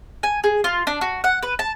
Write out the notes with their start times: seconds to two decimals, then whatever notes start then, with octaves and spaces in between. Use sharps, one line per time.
0.23 G#5
0.44 G#4
0.64 F4
0.87 D4
1.01 F#4
1.24 F#5
1.43 B4
1.59 A5